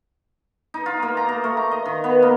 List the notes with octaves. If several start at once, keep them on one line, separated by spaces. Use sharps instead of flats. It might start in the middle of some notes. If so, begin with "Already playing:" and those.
D#4
F4
A#3
A#5
A#3
A3
A#5
D#5
D#3
B3
A#3